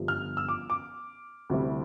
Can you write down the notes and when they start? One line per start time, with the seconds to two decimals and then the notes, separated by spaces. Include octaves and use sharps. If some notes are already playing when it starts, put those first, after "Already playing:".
Already playing: G1 G2 F3
0.08 F6
0.37 E6
0.48 D6
0.70 D6
1.50 D2 C3 G3 C4 E4